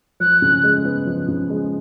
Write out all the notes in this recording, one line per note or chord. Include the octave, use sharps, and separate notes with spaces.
F3 F#6
C#3
G#3
B3
F3
C#3
G#3